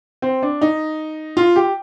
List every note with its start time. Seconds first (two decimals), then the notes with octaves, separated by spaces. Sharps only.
0.22 C4
0.43 D4
0.61 D#4
1.37 F4
1.56 G4